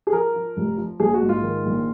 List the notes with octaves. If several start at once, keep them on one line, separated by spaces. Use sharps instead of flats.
G#4
F3 A#4
F3
F1
F3
A#1 G#4
F#4
G#2
F4
D#3
A#1